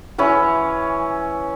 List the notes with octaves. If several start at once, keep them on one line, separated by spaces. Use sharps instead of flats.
E3 C#4 B4